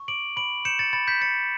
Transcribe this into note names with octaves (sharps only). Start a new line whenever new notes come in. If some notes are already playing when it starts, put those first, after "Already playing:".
Already playing: C#6
D6 D7 F#7
B5 D7 F#7
G6 C#7 E7
A6 C#7
B5 A6
G6 B6
G6 A6 C#7